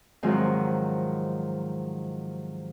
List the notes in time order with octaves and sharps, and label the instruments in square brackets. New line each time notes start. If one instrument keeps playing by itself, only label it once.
[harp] G#2 C3 D#3 F3 F#3 G#3